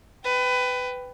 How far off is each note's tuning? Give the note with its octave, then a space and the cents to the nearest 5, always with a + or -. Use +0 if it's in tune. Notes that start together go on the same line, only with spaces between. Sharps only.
B4 +20 G5 +0